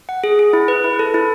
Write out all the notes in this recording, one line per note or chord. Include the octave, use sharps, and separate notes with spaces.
F#5
G#4
G#4
E4
B4
E4
A4
E4